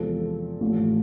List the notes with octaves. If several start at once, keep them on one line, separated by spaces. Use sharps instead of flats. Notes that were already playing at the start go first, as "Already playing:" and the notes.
Already playing: E2 C3 F3 G#3 C4 A4
A1 A2 F3 A3